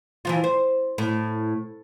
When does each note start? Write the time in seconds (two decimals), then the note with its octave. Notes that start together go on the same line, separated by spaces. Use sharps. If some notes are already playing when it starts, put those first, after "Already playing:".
0.25 E3 F3 F4
0.44 C5
0.98 A2